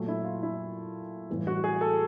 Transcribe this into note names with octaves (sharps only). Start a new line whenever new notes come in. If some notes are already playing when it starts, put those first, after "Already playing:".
Already playing: A#2 F#3 A3
E4
F4
E4
A2 E3 G3
F#4
G#4
A4